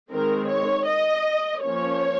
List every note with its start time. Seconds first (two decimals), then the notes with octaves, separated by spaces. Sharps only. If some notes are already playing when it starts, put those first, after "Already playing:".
0.11 D#3 G#3 C4 A#4
0.49 C#5
0.87 D#5
1.63 F3 A#3 C#4 C#5